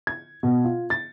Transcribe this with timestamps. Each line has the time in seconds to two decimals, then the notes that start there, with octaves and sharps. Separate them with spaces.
0.07 G#6
0.43 B2
0.64 F4
0.90 A6